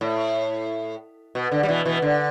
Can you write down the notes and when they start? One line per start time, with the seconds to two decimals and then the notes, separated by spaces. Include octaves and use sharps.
0.01 A2
1.35 B2
1.52 D3
1.63 G3
1.68 B2 E3
1.85 B2 E3
2.02 D3